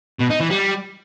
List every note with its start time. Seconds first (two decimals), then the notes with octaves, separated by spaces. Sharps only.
0.19 B2
0.30 D#4
0.40 E3
0.50 G3